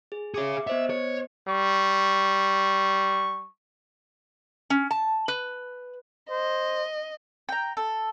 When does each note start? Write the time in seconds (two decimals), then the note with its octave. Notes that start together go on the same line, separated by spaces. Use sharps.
0.12 G#4
0.34 G#4 C#5 E5 D6 C#7
0.67 B3 C5 D#5 E5
0.90 C#5
1.48 G3 C#6
4.70 C#4
4.91 A5
5.28 B4
6.30 C5 D#5
7.49 G5 A#5
7.77 A4